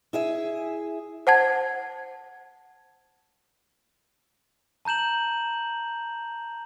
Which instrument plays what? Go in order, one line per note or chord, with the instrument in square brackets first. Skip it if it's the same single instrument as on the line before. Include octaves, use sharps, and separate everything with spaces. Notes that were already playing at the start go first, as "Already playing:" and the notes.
[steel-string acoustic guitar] E4 G#4 E5
[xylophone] C5 F#5 A5 G#6
[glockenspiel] A5 A#5 G6 E7 F#7